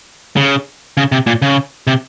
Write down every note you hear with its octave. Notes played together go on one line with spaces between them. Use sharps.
C#3
C#3
C3
A#2
C#3
C3